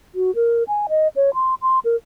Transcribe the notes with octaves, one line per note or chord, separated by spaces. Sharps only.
F#4
A#4
G#5
D#5
C#5
C6
C6
A#4